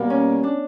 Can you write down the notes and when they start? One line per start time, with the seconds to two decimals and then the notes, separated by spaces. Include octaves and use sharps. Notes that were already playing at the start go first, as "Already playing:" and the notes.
Already playing: B2 G3 A#3 B3
0.10 C#4
0.43 D4